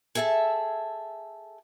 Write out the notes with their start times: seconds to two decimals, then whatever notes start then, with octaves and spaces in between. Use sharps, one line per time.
0.15 G#4 A4 E5 G5 A5